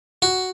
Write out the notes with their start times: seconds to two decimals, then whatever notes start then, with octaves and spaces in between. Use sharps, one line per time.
0.22 F#4